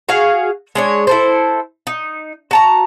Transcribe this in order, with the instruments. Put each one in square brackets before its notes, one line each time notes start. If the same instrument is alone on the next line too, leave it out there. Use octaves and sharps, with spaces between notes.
[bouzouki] F#4 G#4 F5
G#3 D4 C#5
E4 A4 C5
D#4
F#4 A5 A#5